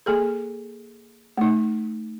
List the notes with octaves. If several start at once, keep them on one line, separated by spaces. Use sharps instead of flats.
A#3 G#4 A4
A3 D#4